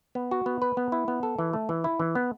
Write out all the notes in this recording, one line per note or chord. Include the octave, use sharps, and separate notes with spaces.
B3
F#4
B3
B4
B3
E4
B3
A4
E3
A3
E3
E4
E3
B3